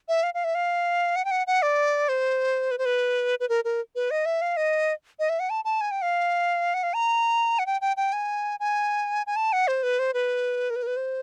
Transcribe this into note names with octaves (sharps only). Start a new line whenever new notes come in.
E5
F5
F5
E5
F5
F#5
G5
F#5
F#5
D5
C5
B4
C5
B4
B4
A#4
A#4
B4
D#5
E5
F5
D#5
D#5
E5
F#5
A5
A5
G#5
G5
F5
F#5
F5
A#5
F#5
G5
G5
G5
G#5
G#5
G#5
A5
F#5
C5
B4
C5
B4
A#4
B4
A#4
B4
C5